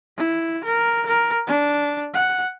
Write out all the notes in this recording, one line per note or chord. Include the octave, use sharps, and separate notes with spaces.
E4
A#4
A#4
D4
F#5